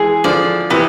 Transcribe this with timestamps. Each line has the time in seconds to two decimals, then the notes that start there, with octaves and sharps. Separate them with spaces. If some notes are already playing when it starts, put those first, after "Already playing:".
Already playing: E3 G#3 G#4
0.24 D3 F3 D5
0.70 C3 E3 B3